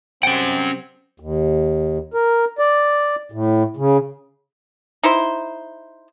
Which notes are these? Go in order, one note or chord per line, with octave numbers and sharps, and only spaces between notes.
C3 G3 C4 C#4 F#5 G5
D#2
A#4
D5
A2
C#3
D#4 E4 C5